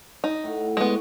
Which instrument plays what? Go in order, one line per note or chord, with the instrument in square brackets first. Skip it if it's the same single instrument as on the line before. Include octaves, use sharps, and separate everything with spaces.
[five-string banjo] D#4
[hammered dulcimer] A2 F#5
[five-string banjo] G#3 B3 [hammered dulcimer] F#4 C5